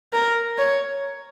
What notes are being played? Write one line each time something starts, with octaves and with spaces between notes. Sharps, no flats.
A#4
C#5